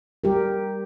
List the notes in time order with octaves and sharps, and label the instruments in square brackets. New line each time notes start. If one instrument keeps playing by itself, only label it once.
[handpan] G3 G4 A#4